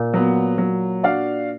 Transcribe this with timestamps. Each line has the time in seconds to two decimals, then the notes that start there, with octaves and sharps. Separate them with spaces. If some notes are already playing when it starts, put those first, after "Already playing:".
Already playing: A#2
0.13 F#3 B3
0.58 F#3
1.03 D4 F#4 D5 F5